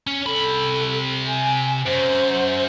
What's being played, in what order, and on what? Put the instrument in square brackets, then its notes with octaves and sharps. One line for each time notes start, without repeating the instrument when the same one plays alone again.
[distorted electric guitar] C#4
[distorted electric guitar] C3 B5 [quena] A4
[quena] G#5
[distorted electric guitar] F#2 [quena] C5